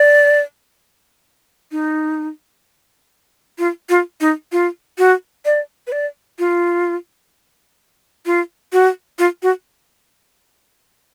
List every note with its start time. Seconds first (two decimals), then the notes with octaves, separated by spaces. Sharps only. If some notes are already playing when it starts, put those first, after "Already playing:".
Already playing: D5
1.72 D#4
3.58 F4
3.89 F4
4.21 D#4
4.52 F4
4.98 F#4
5.45 D5
5.87 B4
5.92 D5
6.39 F4
8.26 F4
8.73 F#4
9.19 F4
9.43 F#4